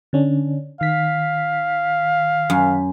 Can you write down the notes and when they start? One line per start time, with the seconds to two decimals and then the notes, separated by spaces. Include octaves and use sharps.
0.13 D3 C#4 D4
0.81 D#3 F5 B6
2.50 F#2